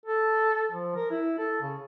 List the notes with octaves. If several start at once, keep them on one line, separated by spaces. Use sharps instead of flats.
A4
F3
A#4
E4
A4
C#3